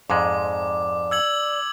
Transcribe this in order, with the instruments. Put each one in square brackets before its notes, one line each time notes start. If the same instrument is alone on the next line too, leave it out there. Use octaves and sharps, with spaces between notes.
[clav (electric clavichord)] F2 G#2 G#3 [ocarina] D5 [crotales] D6
[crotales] E6 G#6 F#7